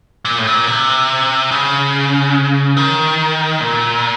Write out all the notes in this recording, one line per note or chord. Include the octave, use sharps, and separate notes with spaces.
A#2
A2
A#2
C3
C#3
D#3
A#2